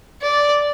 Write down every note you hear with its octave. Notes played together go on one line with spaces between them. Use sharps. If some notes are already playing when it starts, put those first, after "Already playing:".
D5